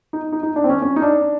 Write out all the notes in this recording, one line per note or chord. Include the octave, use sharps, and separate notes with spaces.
D#4
D#4
D#4
D4
C4
C#4
C#4
D#4
D4